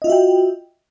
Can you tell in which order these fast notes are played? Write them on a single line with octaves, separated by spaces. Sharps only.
D#5 F4 E5 F#4 G5